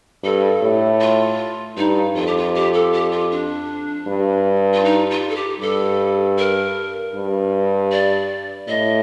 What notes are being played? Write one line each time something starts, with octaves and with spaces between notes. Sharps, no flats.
G2 A4
A2
F4
G2 D#4
F2 F4
G4
F4
G4
A4
G4
F4
D4
G2
F4
D#4
F4
A4
G4
G2 A4
A#4
G2
D5
A2 D#5